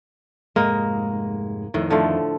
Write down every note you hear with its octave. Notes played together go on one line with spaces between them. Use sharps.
F1 G#2 G#3 A#3 D#5
F2 A2 D#3
D3 F3 A3